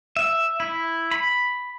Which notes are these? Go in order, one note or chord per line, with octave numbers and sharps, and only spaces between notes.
E5
E4
B5